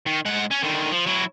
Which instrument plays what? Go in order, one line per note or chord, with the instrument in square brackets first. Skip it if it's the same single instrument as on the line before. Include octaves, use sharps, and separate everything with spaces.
[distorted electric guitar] D#3
G#2 F#5
C#4
D3 D#3
F3
F#3 E4